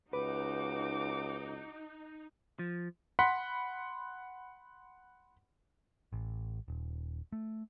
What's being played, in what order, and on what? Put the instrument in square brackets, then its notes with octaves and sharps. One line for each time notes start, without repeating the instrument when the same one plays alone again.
[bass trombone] C#2 [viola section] D#4 [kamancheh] F#4 D6 [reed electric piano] B4
[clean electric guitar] F3
[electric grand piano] F#5 B5 C6 B6
[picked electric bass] A1
D#1
A3